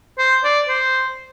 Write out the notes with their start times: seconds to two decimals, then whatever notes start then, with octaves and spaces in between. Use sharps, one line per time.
0.19 C5
0.44 D5
0.69 C5